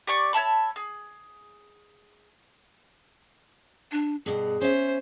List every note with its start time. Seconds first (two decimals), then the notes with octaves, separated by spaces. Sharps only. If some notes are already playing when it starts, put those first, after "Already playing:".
0.07 G4 D5 C#6 D6
0.33 C#5 E5 A5 B5
0.76 G#4
3.92 D4
4.26 G2 B2 G#4
4.61 C#4 C5 E5